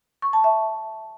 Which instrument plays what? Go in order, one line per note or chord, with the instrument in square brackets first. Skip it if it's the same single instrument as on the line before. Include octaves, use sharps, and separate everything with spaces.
[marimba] C#6
A5
E5